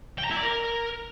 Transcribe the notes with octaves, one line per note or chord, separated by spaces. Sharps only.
G5
A#5
E4
D5
A#4